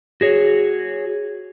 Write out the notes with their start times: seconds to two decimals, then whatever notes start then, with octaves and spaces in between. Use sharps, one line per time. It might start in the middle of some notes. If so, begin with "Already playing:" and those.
0.21 F#4 G#4 C#5